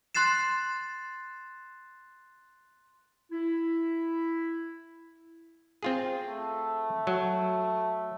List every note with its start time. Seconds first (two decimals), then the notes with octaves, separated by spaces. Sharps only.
0.15 C6 F#6 A6 C7 E7
3.32 E4
5.83 C4 F4 G#4
6.27 A3
7.07 F#3